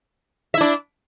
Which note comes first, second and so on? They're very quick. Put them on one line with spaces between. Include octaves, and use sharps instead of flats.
E5 E4 D4